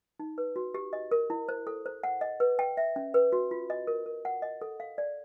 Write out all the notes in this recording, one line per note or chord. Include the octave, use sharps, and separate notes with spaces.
D#4
B4
F#4
G4
D#5
A#4
E4
C5
A4
C5
F#5
D#5
B4
G5
E5
C#4
B4
F#4
F4
D#5
A#4
A#4
F#5
D#5
A4
F5
D5